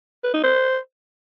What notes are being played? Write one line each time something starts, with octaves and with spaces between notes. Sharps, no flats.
B4
D#4
C5